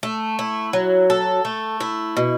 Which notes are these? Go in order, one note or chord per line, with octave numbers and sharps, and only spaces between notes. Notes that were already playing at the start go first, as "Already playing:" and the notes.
A3
E4
F#3
A4
A3
E4
B2